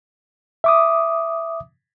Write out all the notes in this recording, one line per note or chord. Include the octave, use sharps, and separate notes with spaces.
E5 D6 D#6